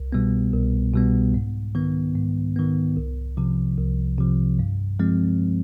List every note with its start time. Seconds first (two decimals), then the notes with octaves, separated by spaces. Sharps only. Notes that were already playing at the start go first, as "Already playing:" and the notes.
Already playing: C2
0.12 B2 G3 B3
0.53 C2
0.93 B2 G3 B3
1.34 G#2
1.75 D#3 B3
2.16 G#2
2.56 D#3 B3
2.97 C2
3.37 C3 F3
3.77 C2
4.18 C3 F3
4.59 G2
4.99 F3 G#3 C4